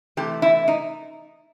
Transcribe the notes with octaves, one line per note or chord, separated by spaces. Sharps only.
C3 E3 A3 G4
E4
D#4